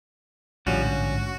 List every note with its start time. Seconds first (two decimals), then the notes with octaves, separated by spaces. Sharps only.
0.67 A#1 A2 D3 F3 G3 C#4 F#4
0.84 G#2